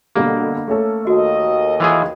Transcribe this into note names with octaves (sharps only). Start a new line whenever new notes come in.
B2 D3 G3 A#3
A3 C#4 A4
D#2 F#4 D#5
E3 F4 G#4